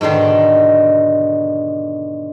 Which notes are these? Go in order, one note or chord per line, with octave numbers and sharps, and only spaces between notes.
G#2 B2 D3 D#3